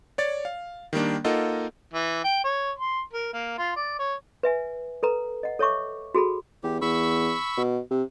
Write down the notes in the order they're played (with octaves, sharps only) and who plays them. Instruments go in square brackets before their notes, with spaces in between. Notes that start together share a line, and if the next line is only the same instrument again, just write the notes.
[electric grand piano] C#5 D5 A6
F5
D#3 G3 A#3 D4
A#3 D#4 F4 A4 D#5 F#5
[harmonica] E3
G5
C#5
C6
A#4
A#3
F4
D5
C#5
[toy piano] B4 E5 G#5
A4 B4 A#5
D#5 F#5
A4 C#5 E5 C#6 D6
F#4 G#4 A4 B5
[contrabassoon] E2 [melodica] G4
[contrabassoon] E2 [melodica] B5 C#6 E6
[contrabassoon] B2
C3